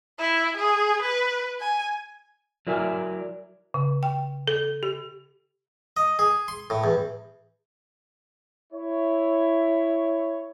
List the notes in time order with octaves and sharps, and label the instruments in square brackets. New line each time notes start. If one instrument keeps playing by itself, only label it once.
[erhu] E4
G#4
B4
G#5
[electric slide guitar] F#3 E4 A#4 D5 E5 G#5
[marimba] C#3
G5
A4
G4
[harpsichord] D#5
G#4
C6
A2
E2
[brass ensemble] E4 C#5